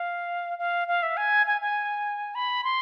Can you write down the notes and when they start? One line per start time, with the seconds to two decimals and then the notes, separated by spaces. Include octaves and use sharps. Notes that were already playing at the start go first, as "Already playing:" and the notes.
Already playing: F5
0.59 F5
0.88 F5
1.03 E5
1.17 G#5
1.47 G#5
1.61 G#5
2.35 B5
2.64 C6